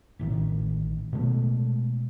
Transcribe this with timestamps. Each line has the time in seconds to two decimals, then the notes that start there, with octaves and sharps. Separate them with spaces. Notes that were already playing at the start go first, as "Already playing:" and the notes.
0.19 A1 A2 D#3
1.13 B2 G#3 A3